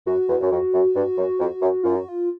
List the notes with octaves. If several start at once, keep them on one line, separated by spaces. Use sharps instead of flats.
F#2 F#4
E2
F#2
F2
F#2
G2
F#2
F2
F#2
F#2 F4
F#4
F4